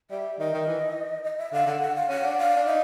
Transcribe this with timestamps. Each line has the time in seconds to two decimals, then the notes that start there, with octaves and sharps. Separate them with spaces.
0.11 G3 E5
0.39 D#3 D#5
0.53 D#3
0.67 E3
1.24 D#5
1.38 E5
1.52 D3 F5
1.66 D3 F#5
1.81 F#5
1.95 F5
2.09 C#4 F#5
2.24 D4
2.39 F5
2.56 D4
2.66 D#4 E5